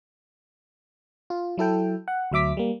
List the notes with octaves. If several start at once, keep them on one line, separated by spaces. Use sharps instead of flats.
F4
F#3 E4 A4 G5
F#5
D2 F#3 E5 D6 B6
G3 A#3